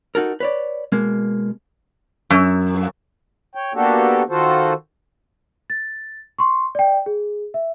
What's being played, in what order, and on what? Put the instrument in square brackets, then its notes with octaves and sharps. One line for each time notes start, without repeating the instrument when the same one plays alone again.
[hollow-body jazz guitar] D#4 F#4 A4 A#4
B4 C#5 D5
B2 G#3 A#3
[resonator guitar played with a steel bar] F#2
[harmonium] C#5 G5
A#3 B3 D4 F#4 G4 A4
D#3 F4 F#4 A4 C5
[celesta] A6
C6 C#6
D5 G5
G#4
E5